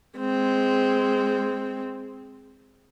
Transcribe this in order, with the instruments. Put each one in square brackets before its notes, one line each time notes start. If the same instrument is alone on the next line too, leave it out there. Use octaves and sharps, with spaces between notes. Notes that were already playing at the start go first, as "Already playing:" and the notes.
[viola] G#3 C4